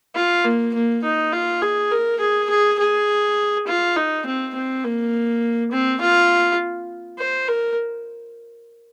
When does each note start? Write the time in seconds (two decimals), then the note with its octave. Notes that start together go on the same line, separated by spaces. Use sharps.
0.15 F4
0.44 A#3
0.74 A#3
1.03 D#4
1.32 F4
1.62 G#4
1.91 A#4
2.20 G#4
2.50 G#4
2.79 G#4
3.67 F4
3.96 D#4
4.25 C4
4.55 C4
4.84 A#3
5.71 C4
6.01 F4
7.18 C5
7.48 A#4